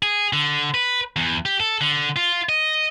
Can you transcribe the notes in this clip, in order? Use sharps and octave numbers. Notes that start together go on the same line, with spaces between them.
G#4
D3
B4
E2
G4
A4
D3
F4
D#5